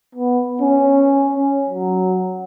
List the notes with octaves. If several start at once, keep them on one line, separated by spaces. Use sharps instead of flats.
B3
C#4
F#3